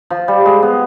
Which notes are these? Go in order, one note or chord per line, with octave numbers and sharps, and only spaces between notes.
F3
G3
G#3
B3